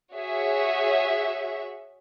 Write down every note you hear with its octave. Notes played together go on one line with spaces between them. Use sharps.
F#4 G#4 C#5 E5